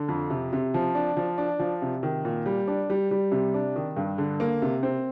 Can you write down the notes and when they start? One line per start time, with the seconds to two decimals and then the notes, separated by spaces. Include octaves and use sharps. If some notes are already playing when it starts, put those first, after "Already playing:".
Already playing: D3
0.08 F2
0.30 C3
0.53 C3
0.74 F3
0.95 D4
1.17 F3
1.38 D4
1.59 F3
1.82 C3
2.03 D#3
2.25 A#2
2.46 G3
2.67 D4
2.90 G3
3.11 G3
3.32 C3
3.54 D4
3.76 D#3
3.97 G2
4.18 D3
4.40 A#3
4.62 C3
4.83 C4